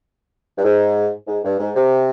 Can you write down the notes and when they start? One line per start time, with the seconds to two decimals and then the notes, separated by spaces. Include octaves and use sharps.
0.58 G2
0.64 G#2
1.28 G#2
1.44 G2
1.59 G#2
1.75 C3